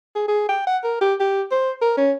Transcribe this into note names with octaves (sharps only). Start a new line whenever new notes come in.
G#4
G#4
G5
F#5
A#4
G4
G4
C5
A#4
C#4